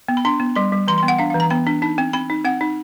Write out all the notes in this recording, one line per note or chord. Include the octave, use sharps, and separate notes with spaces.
B3
B5
D4 C6
B3
G3 C6
G3
E3 C6
C6
B3
F#5
D4 F5
F5
E3
A#5
B3 B5
D4
D#4 A5
C4
C4 B5
D#4
C4 F#5
D#4